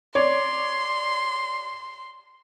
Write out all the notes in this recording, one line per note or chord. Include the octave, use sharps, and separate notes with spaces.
C#5 D5 C6